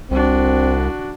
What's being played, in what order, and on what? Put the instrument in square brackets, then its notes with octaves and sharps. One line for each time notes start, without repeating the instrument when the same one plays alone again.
[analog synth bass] C2 [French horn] C4 [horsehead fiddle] D4 F#4